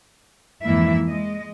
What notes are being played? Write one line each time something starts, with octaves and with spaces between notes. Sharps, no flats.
F2 G#2 E3 A#3 E4 E5
G#3 D#5